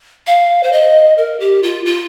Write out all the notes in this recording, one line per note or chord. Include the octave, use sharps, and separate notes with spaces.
F5
C5
D#5
A#4
G4
F4
F4